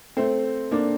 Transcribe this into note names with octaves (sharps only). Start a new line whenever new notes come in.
A3 C4
A#3 D4